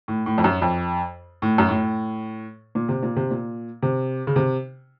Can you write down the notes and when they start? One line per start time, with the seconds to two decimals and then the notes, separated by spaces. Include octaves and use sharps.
0.08 A2
0.26 A2
0.38 F2
0.44 F#2
0.62 F2
1.42 A2
1.58 F#2
1.69 A2
2.75 A#2
2.89 C3
3.03 A#2
3.16 C3
3.31 A#2
3.82 C3
4.27 C#3
4.36 C3